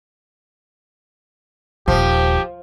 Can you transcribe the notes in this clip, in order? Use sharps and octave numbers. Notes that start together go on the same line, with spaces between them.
D#1 F3 G4